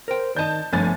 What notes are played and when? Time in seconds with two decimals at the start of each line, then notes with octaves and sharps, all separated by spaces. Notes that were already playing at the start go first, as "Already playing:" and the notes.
0.08 A#4 C5 G5
0.36 D#3 D5 D#5 A5 G6
0.73 G1 F3 A3 D4 C#5 G#5 A6